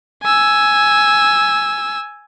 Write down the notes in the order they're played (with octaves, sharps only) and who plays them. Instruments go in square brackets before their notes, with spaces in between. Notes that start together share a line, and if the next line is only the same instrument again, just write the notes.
[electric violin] G#5 E6